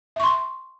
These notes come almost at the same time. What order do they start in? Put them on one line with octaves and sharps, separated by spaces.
E5 C#6 C6